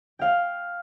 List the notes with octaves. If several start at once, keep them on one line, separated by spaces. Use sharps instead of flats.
F5 G5